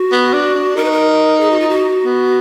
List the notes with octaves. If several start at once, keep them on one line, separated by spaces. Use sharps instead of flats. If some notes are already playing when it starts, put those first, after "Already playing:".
Already playing: F#4
B3
D4
D4
D#4 A#4
B4
A#4
G#4
F#4
F4
F#4
B3